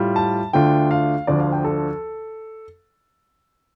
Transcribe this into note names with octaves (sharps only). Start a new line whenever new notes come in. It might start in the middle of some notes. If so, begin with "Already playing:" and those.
Already playing: A2 G3 F4
A5
D2 D3 A3 D4 F4 G5
F5
D2 D3 F3 D4 D5
F5
G5
A4